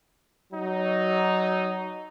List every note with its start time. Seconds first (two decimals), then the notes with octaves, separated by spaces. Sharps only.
0.53 F#3 D#4